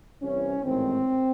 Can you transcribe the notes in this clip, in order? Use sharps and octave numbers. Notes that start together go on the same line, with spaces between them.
C2 C3 E3 C#4
A1 G#2 D#3 C4